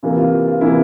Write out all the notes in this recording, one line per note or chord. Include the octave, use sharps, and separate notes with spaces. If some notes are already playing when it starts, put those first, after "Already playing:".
C3 E3 A#3 F4
F4
F4
C3 E3 A#3 E4